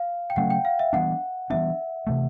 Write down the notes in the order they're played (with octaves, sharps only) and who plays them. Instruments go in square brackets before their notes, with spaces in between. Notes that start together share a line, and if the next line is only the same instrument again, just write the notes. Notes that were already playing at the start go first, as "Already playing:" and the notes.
Already playing: [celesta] F5
G5
[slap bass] C#3 F#3 A3 C#4 [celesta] F#5
[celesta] G5
F5
E5
[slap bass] E3 G3 B3 D4 [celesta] F#5
[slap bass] E3 G3 B3 D4 [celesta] E5
[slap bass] C3 E3 A3